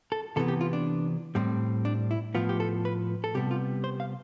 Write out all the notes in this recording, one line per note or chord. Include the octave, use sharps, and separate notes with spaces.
A4
C3 E3 B3 A4
G4
F4
D4
A2 G3 C4
D4
E4
A2 F3 B3 F4
G4
A4
B4
A4
C3 G3 B3 G4
F4
C5
F5